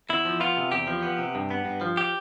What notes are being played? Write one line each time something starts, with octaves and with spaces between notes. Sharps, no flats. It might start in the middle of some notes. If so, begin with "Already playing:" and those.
E2 E4
F3
B3 F4
C3
E2 G4
F3
B3
C3
G2
B3
G2
F3
G4